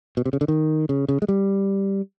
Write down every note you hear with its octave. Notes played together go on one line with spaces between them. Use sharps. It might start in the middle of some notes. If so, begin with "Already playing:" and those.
B2
C3
C#3
D3
D#3
C#3
C#3
G#3
G3